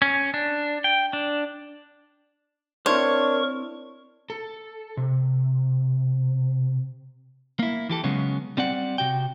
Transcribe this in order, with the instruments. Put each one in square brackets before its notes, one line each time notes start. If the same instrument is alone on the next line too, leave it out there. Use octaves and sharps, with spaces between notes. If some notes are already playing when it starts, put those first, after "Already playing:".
[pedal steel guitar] C#4
D4
G5
D4
[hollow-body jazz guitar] C4 E4 C5 [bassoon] D4 [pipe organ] A#4 C#6 [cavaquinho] C#5
[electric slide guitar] A4
C3
[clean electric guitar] A#3 E4
E3 G4 A4
C#3 F#3 G#3 B3 C#4
G3 C4 D5 F#5
C3 F#4 G5